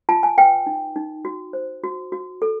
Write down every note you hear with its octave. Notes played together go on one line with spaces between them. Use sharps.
F4 A5
G#5
B4 G5
D#4
D#4
F#4
C5
F#4
F#4
A4